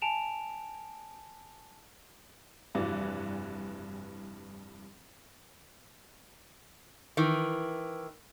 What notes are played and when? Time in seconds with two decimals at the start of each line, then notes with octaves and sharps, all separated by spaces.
0.02 G#5 A5 D7 E7 F7
2.75 F1 G2 E3 F#4 D5
7.17 D#3 E3